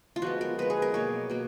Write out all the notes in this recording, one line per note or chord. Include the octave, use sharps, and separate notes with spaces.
F4
F3 G#3 B3 F#4
A#4
F3 G#3 B3 B4
G#4
A#4
B2 F#3 A#3 C#5
B2 F#3 A#3